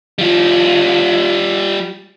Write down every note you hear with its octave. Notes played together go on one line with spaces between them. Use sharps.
G3 F4